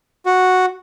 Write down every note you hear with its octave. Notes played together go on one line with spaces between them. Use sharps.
F#4